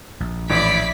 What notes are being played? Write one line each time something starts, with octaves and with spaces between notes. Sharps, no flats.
A#1
A1 E4 D5 D6 B6